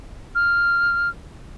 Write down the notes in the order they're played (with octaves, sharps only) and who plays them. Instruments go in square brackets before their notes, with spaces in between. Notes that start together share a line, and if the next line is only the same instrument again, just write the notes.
[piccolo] F6